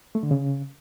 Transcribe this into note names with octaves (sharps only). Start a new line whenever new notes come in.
A3
D3
C#3